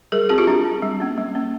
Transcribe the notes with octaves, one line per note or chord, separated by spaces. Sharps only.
G3 G#4 A#4
C4 F#4 G#4
F4 G4
G3 D4
C4
G3
A#3 C#4
G3
A#3 C#4